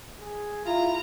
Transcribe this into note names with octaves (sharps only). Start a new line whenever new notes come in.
G#4
E4 F4 A#5